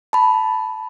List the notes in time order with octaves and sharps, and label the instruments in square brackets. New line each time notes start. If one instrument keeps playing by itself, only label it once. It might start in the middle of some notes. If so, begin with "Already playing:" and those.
[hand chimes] A5 B5